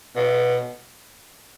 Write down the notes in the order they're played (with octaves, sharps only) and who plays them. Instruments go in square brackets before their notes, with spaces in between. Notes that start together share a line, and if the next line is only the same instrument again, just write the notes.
[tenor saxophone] B2